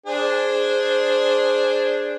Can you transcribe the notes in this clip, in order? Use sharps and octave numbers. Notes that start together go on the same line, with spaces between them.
D4 G#4 C5